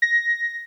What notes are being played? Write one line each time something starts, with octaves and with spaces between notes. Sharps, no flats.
A#6